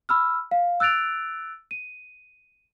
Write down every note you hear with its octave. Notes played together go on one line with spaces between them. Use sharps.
B5 E6 F6
F5
E6 F#6 A6 D7 F7
D#7